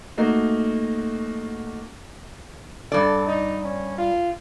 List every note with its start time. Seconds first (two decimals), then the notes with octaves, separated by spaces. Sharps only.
0.18 A3 A#3 D#4 F#4
2.92 G2 A4 D5
3.27 D#4
3.65 C#4
3.98 F4